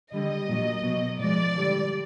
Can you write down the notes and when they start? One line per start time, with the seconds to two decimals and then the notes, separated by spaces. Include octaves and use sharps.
0.13 D3 G3 D#5
0.48 A#2 F#3
0.84 B2 F#3
1.19 A2 F3 G#3 D5
1.56 D3 G3